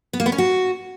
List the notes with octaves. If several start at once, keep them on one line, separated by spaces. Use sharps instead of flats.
B3
A#3
B3
C#4
F#4